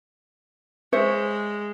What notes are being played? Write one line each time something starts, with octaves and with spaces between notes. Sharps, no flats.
G#3 C5 C#5 E5